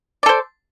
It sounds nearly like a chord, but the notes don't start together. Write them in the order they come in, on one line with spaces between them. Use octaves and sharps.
D5 A4 C5